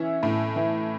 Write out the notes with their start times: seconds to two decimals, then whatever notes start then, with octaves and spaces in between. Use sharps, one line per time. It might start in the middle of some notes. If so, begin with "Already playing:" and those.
Already playing: E3 C#4 E5
0.23 A2
0.56 E3